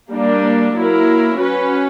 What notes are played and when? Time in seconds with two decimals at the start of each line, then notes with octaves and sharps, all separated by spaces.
0.11 G3 A#3 D4
0.75 F#3 A#3 E4 A#4
1.39 C#4 F#4 B4